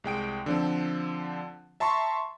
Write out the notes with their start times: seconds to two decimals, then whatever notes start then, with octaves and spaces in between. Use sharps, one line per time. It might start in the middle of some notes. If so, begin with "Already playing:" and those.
0.04 C2 G#3 G5 D7
0.46 D3 F3 C4
1.80 E5 A5 A#5 C6 C#6